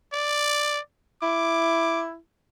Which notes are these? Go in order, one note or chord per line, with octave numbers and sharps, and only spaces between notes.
D5
E4 D6